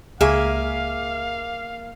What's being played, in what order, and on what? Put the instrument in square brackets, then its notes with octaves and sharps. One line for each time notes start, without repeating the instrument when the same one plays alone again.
[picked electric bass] C#2 [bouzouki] A#3 E5 G#5 [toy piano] G#4 C#6 [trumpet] F5